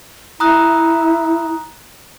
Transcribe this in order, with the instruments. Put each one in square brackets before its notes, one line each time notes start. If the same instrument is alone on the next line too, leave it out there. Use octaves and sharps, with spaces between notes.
[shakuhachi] E4 [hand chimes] A#5 D#6 F#6